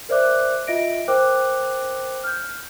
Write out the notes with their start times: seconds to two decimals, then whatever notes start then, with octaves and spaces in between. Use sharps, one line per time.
0.09 A#4 C5 D5 E5 D6 F#6
0.67 F4 D#5 E5 A#6 D7
1.08 A#4 C5 G5 D6 F#6
2.24 F6 G6